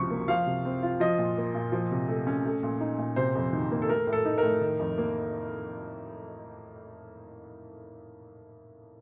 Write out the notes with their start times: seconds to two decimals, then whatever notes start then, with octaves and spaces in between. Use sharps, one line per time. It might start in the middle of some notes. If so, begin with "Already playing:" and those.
Already playing: C#2 C3 F3 C#6
0.10 A#3
0.28 F3 F5
0.47 C3
0.65 C4
0.83 F4
1.00 F3 D#5
1.18 A#2
1.37 A#3
1.54 A#2
1.72 F3
1.91 C3
2.08 A3
2.27 C#4
2.45 A3
2.63 A#2
2.80 D#4
2.98 A#2
3.16 C3 C5
3.35 F2
3.53 D#3
3.71 A#3
3.82 A4
3.89 A3 A#4
4.07 A2
4.13 A4
4.25 D#4
4.38 A2 A#4
4.61 D#3
4.79 F2
4.98 A#3